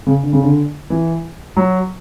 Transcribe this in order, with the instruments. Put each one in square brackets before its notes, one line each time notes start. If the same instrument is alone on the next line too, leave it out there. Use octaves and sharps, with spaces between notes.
[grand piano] C#3
D3
C#3
D3
E3
F#3